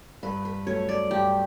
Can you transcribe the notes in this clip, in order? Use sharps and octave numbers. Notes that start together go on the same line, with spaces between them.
G2 B4
B4
F#3 A3 C#4 C#5
D5
G2 G4